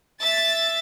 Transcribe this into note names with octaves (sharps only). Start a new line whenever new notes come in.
E5 A6